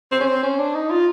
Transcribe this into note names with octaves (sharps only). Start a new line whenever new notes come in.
C4
C#4
C4
C#4
D4
D#4
F4